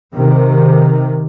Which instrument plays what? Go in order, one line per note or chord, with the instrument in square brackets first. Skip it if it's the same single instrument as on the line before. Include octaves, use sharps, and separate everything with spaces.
[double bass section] C3 D#3